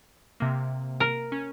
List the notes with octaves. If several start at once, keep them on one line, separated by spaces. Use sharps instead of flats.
C3 A#3
A#4
C#4